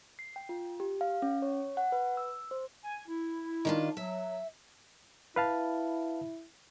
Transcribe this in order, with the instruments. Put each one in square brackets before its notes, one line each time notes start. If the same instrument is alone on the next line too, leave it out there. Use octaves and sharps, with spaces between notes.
[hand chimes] C7
G5
F4
G4
F5
C#4
C#5
F#5
B4
E6
C5
[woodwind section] G#5
E4
[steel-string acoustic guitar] D#3 D4 F4
[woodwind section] F#3 [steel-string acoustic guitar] E5
[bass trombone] E4 [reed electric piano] B4 F5 A5